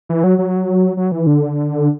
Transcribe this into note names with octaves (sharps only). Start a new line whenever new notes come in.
E3
F#3
F#3
F#3
E3
D3